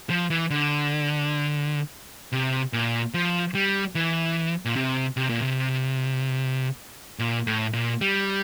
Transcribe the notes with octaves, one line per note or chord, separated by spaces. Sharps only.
F3
E3
D3
C3
A#2
F3
G3
E3
A#2
C3
C3
A#2
C3
A#2
A2
A#2
G3